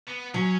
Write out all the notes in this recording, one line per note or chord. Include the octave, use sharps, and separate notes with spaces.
B3
F#3 C#4